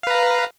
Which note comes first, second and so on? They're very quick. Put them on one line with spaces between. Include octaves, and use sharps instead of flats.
F5 B4 A#5